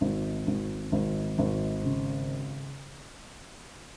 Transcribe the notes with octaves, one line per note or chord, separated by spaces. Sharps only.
G#1
G#1
G#1
G#1
C#3